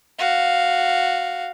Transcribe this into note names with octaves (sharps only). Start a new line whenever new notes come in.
F#4 F5